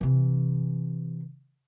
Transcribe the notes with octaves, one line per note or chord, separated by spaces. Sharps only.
C3 E3